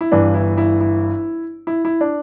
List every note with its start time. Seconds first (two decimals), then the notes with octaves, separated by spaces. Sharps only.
0.01 E4
0.12 G1 G2 E3 D4
0.34 E4
0.58 E4
0.81 E4
1.67 E4
1.85 E4
2.01 D4